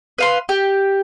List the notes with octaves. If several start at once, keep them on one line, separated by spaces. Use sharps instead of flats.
B4 F5 C6
G4